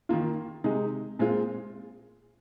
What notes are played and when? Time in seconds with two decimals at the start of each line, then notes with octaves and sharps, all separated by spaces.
0.09 D#3 A#3 F4
0.64 C3 G#3 D#4
1.19 A#2 G#3 C4 F4